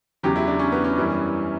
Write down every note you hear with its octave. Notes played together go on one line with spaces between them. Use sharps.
E2 C#3 F#3 G4
E4
D4
C#4
B3
C#4
F#2 E3 G3